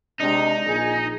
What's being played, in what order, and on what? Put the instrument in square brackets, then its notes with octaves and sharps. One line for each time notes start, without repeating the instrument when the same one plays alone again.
[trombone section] C3 G#3 D4 [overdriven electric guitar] D#4
[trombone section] A#1 G#4